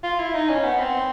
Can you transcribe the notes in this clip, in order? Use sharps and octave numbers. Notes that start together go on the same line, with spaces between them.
F4
E4
D#4
C#4
B3
C4